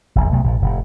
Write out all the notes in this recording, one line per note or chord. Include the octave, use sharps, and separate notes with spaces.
F1 A#1 E2
B1 C3 A3
A#1 D#3 F3
F1 A2